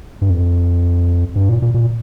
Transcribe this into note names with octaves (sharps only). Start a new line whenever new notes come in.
G2
F2
G2
A#2
A#2
A#2